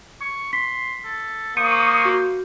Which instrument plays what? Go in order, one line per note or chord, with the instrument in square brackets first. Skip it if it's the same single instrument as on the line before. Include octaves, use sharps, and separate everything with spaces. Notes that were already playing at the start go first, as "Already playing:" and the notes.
[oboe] C#6
[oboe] C6 [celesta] B6
[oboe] A4
[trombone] A#3 [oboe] C5 [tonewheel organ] C#6 D#6
[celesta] F#4